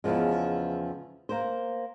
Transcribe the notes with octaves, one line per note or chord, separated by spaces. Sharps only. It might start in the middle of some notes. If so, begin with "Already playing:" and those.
E2 C#3 E3 F3 G#3
A#3 A#4 C5